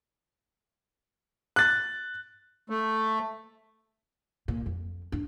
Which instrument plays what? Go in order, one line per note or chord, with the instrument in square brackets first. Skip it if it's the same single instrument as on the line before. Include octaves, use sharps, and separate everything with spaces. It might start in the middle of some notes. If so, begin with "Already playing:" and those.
[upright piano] F#6 A6
[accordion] A3
[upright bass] A#2
F2
D4